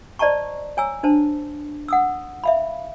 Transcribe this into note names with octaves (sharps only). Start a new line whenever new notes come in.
C5 D5 D#5 A5 A#5 C#6
C#5 G#5 A#5 E6
D4 C5 A5
F#5 D#6 E6
E5 F5 B5